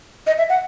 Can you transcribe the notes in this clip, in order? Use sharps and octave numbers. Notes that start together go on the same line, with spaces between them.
D#5
E5
F#5